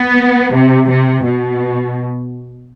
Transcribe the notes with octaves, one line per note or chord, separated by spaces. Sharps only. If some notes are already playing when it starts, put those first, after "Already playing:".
Already playing: B3
C3
C3
B2